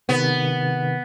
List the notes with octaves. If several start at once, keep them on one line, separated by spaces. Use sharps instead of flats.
C3 D#3 B3 B4